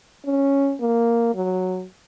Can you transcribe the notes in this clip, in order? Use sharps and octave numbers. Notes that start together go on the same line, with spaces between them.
C#4
A#3
F#3